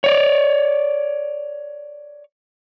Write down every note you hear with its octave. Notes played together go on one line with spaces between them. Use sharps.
C#5 D5